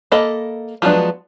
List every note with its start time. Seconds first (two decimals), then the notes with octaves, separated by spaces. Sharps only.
0.12 A#3 A4 D#5 B5
0.82 F3 F#3 G#3 B3 D4